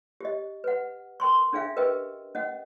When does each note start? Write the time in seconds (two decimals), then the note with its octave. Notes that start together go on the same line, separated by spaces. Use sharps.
0.20 G4 D#5
0.64 B4 F#5
1.20 A#4 G5 C6 C#6
1.53 C#4 D4 G#4 E5 F5 G5
1.76 G4 A#4 B4 D#5 G5
2.35 C#4 D#5 F#5